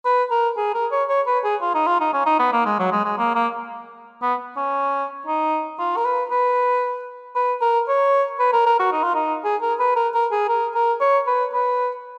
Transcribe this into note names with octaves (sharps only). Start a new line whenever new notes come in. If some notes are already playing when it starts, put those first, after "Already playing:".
B4
A#4
G#4
A#4
C#5
C#5
B4
G#4
F4
D#4
F4
D#4
C#4
D#4
B3
A#3
G#3
F#3
G#3
G#3
A#3
A#3
B3
C#4
D#4
F4
A#4
B4
B4
B4
A#4
C#5
B4
A#4
A#4
F#4
D#4
F4
D#4
G#4
A#4
B4
A#4
A#4
G#4
A#4
A#4
C#5
B4
B4